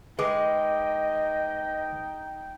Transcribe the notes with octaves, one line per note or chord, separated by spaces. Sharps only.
G#3 D#4 B4 D#5 G5 D6